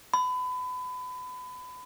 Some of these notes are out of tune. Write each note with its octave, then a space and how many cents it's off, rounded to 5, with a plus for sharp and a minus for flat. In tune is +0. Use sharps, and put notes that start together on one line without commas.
B5 +30